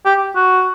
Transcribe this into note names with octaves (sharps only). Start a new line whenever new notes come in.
G4
F#4